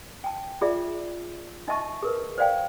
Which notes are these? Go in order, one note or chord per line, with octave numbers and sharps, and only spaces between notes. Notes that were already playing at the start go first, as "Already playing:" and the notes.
G5 A5
F4 G#4 D5 E5
D#4 D#5 E5 A5 C#6
G#4 A#4 B4
C5 D5 F5 G5